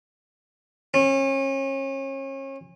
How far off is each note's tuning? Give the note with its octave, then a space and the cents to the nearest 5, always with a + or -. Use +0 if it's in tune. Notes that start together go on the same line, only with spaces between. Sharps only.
C#4 -35